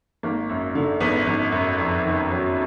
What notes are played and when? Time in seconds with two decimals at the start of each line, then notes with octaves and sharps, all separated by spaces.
0.23 G#1 A#3
0.49 F#2
0.75 D3
1.00 G#1 B3
1.27 G#1
1.52 F#2
1.78 F2
2.05 D#3
2.31 F#3